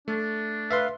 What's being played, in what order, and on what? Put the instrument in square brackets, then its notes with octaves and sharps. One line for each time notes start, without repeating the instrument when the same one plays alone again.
[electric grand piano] A3 [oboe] D4
[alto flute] B4 [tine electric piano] E5 F5 C6